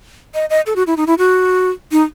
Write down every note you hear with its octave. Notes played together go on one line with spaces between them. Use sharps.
D#5
D#5
A4
F#4
E4
D#4
E4
F#4
D#4